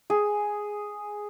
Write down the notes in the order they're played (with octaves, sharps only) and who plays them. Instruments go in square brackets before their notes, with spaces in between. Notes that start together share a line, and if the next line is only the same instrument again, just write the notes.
[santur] G#4